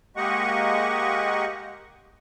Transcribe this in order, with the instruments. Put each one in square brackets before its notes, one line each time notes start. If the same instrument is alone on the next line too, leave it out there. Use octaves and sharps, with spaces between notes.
[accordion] G#3 A#3 G4 D#5 F#5 C#6